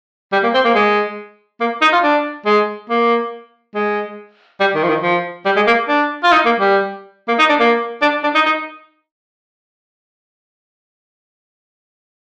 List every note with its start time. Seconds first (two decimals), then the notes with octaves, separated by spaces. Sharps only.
0.33 G3
0.43 A#3
0.54 C4
0.65 A#3
0.75 G#3
1.61 A#3
1.81 D#4
1.93 F4
2.04 D4
2.45 G#3
2.89 A#3
3.75 G#3
4.60 G3
4.75 D#3
4.83 F3
4.89 D#3
5.03 F3
5.45 G3
5.56 G#3
5.67 A#3
5.88 D4
6.23 F4
6.32 D#4
6.46 A#3
6.60 G3
7.28 A#3
7.39 D#4
7.49 D4
7.60 A#3
8.02 D4
8.23 D4
8.35 D#4
8.46 D#4